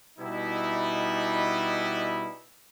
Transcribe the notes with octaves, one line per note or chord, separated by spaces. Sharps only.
B2 G3 D#4 E4